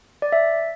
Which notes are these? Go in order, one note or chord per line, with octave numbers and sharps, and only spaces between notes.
D5
E5